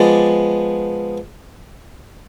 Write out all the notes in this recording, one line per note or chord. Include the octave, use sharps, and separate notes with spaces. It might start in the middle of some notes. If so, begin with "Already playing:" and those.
Already playing: F3 G#3 B3 D5